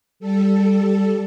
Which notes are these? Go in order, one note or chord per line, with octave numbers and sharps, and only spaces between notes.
G3 A4